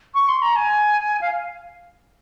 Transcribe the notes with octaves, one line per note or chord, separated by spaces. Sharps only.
C#6
C6
A#5
G#5
F5